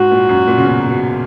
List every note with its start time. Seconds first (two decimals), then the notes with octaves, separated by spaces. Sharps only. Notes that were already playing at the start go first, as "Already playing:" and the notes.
Already playing: G#2 F#4
0.11 A#2
0.29 F#2
0.47 A#2
0.58 C#3
0.65 B2
0.89 B2